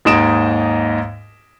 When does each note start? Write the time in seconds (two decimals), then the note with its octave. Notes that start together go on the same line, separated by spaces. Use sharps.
0.05 D#2 G#2 D#4 D#5 D7 E7